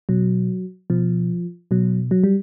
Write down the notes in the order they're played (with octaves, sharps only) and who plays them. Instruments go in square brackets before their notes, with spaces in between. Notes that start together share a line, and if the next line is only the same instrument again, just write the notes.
[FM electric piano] B2 F#3
B2 F3
B2 F#3
F#3
G3